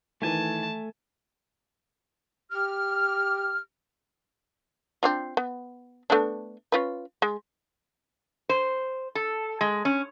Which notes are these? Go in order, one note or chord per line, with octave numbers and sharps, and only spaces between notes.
D#3 E3 A3 G#5 A5
G4 F6
C4 D4 F4
B3
A3 B3 D4
C#4 F4 B4
G#3
C5
A4
G#3
C#4